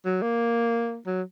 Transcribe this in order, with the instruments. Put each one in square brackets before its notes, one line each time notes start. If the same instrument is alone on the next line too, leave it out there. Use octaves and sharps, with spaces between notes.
[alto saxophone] F#3
A#3
F#3